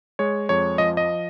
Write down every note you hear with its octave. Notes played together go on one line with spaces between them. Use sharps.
G#3 C#5
F2 C#5
F3 D#5
D#5